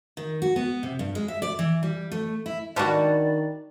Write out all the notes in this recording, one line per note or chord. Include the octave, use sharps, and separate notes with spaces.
D#3
F#4
B3
C3
G2
G#3
E5
D5
E3
G3
A3
E4
D#3 G3 D4 F#4 B4 D5 A5